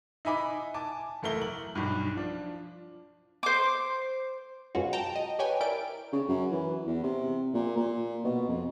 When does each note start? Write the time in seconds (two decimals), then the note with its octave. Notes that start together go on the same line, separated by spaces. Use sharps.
0.25 D#4 D#5 E5 G#5 B5 D6
0.74 G#5 A5 D6
1.22 F#1 E2 A3 A#4 E5 G7
1.41 F#7
1.75 B1 G2
2.17 F3 D4
3.43 C5 D6
4.75 F#2 B2 G#3 C#4 F4 F#4
4.93 G5 A5 A#5
5.15 D#5
5.39 G4 B4 C#5 G5 G#5
5.61 E4 A#4 D5 G5 D7
6.12 C#3
6.28 F#2
6.51 E3
6.86 E2
7.03 C3
7.54 A#2
7.76 A#2
8.24 B2
8.48 F2